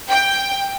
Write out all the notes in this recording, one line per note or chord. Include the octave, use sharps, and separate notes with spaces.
G5